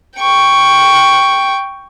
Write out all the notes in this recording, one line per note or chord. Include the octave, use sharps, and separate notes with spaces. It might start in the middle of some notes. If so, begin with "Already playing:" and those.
G5 C#6